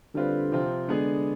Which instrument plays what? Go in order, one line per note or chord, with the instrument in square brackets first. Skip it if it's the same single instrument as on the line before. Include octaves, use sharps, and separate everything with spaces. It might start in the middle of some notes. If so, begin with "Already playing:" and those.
[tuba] D3 [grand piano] G3 C4 F4 B4
[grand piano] C3 F3 C4 F4
[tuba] D3 [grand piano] G#3 B3 D4 G#4